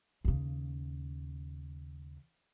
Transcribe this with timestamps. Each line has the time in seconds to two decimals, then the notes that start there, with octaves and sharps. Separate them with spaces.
0.25 D#2 C#3